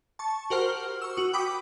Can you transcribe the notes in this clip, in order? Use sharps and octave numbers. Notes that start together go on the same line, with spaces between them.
A5 C#6
F#4 G4 A#4 C5 F#5 F6
C#6 E6
F#4 D#6
G5 B5 D6 D#6 B6